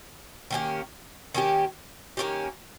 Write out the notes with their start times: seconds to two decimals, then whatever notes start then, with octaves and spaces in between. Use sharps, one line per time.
0.51 D#3 A#3 C#4 G4
1.34 D#3 A#3 C#4 G4
2.17 D#3 A#3 C#4 G4